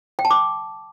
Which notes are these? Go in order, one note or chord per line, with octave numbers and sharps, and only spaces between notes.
G5
A5
D6